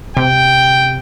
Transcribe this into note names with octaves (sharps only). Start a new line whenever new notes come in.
C3 G5